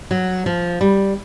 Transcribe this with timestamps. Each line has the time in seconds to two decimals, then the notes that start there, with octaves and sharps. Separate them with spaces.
0.11 F#3
0.46 F3
0.81 G3